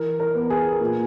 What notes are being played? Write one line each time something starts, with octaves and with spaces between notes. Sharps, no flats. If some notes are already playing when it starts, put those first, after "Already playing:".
Already playing: E3 A#4
A#4
B3
G#4
A#2